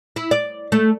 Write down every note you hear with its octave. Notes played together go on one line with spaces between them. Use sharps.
E4
D5
A3